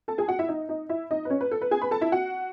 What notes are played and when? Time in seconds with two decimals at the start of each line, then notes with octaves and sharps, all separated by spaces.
0.08 A4 A5
0.18 G#4 G#5
0.28 F#4 F#5
0.39 E4 E5
0.48 D#4 D#5
0.69 D#4 D#5
0.89 E4 E5
1.11 D#4 D#5
1.25 B4
1.30 C#4 C#5
1.41 B4
1.51 A4
1.62 B4
1.71 G#4 G#5
1.82 B4 B5
1.91 A4 A5
2.01 E4 E5
2.12 F#4 F#5